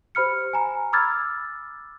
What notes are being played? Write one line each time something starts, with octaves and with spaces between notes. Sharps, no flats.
G4 C5 B5 F6 C#7
G#5 A#5
B5 D6 E6 F6 G#6 A6